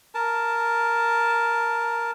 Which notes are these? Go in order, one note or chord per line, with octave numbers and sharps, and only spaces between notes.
A#4 A5